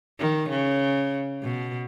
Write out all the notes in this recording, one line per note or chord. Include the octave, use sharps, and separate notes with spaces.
D#3
C#3
B2